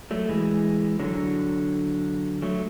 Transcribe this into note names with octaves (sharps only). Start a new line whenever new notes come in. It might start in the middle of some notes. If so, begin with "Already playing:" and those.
F#3 A3
E3 G#3
D3 F#3
F#3 A3